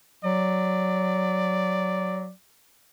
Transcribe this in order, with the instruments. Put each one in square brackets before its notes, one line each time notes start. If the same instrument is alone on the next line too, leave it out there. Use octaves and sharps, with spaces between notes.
[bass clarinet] F#3 [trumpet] D5